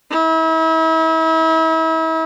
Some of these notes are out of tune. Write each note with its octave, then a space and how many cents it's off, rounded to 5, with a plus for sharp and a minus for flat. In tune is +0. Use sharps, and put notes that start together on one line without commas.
E4 -35